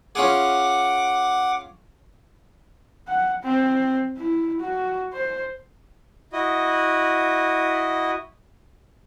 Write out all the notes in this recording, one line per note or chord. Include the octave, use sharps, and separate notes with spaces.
C#4 F4 G#4 F#5 D6
F#5
C4
E4
F#4
C5
E4 F#4 D#5